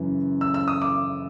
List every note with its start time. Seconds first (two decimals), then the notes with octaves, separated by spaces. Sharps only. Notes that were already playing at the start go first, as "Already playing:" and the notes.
Already playing: F#2 C#3 E3
0.41 E6
0.54 E6
0.68 D#6
0.82 D6